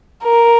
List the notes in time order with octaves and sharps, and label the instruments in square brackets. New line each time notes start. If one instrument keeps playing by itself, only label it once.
[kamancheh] A#4